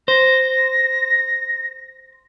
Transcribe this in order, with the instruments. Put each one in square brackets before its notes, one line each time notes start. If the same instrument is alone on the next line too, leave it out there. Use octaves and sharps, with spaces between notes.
[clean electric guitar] C5 [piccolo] A#6